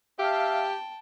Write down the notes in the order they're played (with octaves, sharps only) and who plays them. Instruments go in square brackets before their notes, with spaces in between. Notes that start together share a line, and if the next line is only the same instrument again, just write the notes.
[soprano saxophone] G4 [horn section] E5 F5 [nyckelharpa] G5 A5